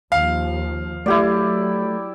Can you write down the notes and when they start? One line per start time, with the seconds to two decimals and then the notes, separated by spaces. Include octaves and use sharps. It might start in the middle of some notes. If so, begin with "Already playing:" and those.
0.12 D#2 F3 F5
1.06 F#3 A3 E4 G4 D5